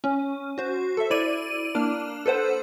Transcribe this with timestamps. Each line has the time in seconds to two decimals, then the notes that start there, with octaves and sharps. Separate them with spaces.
0.04 C#4
0.58 F#4 C5
0.97 A4 E5
1.10 E4 D5 D#7
1.75 A#3 D4 F6
2.26 A4 B4 C5 F#5